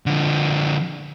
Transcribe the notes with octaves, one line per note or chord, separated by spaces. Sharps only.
D3 F3